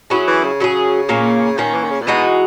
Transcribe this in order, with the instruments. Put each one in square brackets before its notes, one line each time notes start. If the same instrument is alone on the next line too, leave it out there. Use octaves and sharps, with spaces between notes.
[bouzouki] F#3 C#4 E4 G#4
[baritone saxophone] E3
C#3
[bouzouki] F#3 C#4 E4 G#4
A#2 A#3 C#4
[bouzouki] A#2 A#3 C#4 [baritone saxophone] D#3
[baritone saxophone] E3
D#3
C#3
A#2
[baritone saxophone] B2 [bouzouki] E3 G#3 D#4 F#4